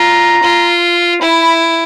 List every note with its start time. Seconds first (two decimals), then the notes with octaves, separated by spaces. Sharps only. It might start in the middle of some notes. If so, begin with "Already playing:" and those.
Already playing: F4 A#5
0.43 F4
1.21 E4 B5
1.41 B5